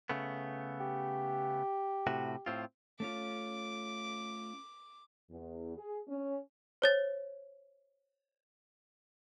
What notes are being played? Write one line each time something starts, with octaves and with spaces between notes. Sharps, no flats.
C#3 A3 B3
G4
A2 C3 F#4
A2 C4 F4
A3 C#4 F4 D6
E2
G#4
C#4
C5 C#5 A6